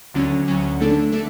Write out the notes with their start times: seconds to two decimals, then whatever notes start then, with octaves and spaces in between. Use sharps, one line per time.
0.14 D2 D3 F#3 C#4
0.48 D2 D3 F#3 C#4
0.80 D3 A3 D4 A4
1.12 D3 A3 D4 A4